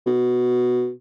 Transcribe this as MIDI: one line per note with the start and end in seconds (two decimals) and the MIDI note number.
0.06 0.91 47